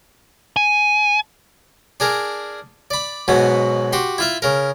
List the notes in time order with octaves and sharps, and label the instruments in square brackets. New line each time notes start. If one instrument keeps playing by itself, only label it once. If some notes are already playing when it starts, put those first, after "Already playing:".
[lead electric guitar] G#5
[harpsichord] D4 G#4 A#4
D5 B5
G#2 B2 F#3 B3
F#4 G4 C6
E4 F4 E5
C#3 A#4